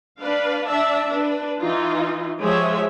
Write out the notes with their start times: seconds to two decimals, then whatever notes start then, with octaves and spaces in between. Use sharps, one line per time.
0.19 D4 B4 D5 F5
0.66 D4 D5 E5 A5
1.14 D4 B4
1.61 E3 D#4 F4
2.41 F3 G#3 G4 G#4 C#5 E5